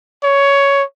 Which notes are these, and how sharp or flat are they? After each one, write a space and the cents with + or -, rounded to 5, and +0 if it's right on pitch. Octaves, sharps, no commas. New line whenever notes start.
C#5 +10